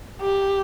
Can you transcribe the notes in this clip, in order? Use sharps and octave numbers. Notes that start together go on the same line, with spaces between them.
G4